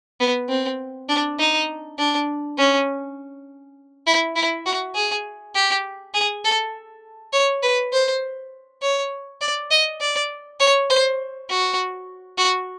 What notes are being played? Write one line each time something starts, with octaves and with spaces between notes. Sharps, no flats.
B3
C4
D4
D#4
D4
C#4
E4
E4
F#4
G#4
G4
G#4
A4
C#5
B4
C5
C#5
D5
D#5
D5
C#5
C5
F#4
F#4